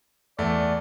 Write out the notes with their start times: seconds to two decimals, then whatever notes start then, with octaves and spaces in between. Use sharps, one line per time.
0.38 E2 A3 D5